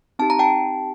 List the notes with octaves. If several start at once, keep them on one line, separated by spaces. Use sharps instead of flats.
C4 D#4 G4 A5
A#5
G5 A5